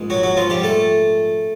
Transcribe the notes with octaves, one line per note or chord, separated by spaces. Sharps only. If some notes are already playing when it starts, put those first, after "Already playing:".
Already playing: A#1 G#2
F#3 F#4
F#3 F#4
F3 F4
G3 G4
A3 A4